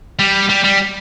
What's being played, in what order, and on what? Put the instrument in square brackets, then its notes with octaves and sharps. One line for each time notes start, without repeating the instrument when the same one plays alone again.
[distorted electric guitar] G3
G3
G3